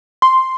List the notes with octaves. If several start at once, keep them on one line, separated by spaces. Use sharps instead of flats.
C6